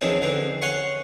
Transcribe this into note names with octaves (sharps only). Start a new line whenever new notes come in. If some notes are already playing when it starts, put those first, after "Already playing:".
E2 D#3 F3 C4 C#4 D#6
D3 E3 C4
C#5 F5 F#5 G#5 C6 C#6